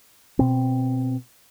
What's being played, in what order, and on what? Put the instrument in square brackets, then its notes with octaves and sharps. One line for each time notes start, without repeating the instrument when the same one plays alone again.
[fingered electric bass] B2 C4